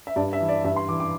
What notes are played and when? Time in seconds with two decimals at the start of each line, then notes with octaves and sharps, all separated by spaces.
0.07 E5
0.16 G2 D5
0.33 E5
0.40 E3
0.49 D5
0.64 G2 E5
0.76 C6
0.88 E3 D6
1.00 D6